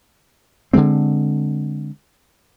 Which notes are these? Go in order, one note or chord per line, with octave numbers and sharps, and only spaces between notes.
D3 F3 G#3 C4